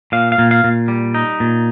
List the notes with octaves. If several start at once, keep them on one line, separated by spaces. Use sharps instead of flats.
A#2 F5
F5
A#2
F5
A#2
G3
D#4
A#2